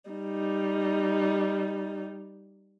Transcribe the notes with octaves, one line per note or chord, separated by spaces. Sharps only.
G3 D#4